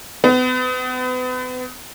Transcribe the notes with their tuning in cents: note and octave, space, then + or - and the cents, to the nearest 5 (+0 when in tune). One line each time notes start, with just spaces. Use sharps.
B3 +40